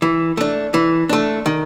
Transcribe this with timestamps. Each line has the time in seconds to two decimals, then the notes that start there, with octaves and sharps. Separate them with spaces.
0.02 E3
0.37 A3 D4
0.74 E3
1.09 A3 D4
1.46 D#3